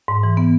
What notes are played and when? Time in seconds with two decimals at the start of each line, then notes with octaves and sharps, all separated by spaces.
0.08 G#2
0.23 E3
0.37 B3